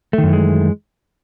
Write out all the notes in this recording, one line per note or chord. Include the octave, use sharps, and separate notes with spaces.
F#2 D#3 E3 G#3 A3